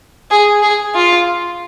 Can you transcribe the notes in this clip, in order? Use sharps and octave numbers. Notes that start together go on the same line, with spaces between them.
G#4
G#4
F4